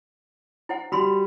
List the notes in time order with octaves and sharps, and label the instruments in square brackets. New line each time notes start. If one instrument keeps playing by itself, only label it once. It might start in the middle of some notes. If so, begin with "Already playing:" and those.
[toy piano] E4 C5 F#5
[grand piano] G3 [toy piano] F#4 B5 C6